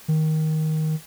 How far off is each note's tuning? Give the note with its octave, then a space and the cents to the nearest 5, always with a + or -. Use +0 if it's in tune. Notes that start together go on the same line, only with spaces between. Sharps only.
D#3 +10